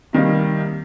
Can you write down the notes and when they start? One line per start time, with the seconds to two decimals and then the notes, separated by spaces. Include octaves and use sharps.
0.13 C3 D#3 G3 A#3